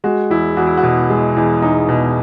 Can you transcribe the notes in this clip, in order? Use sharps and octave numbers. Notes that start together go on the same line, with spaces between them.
G#3 F#4
E2 E4
E2 F#4
E4
F#4
B2
G#3
E2
E2 D#4
B2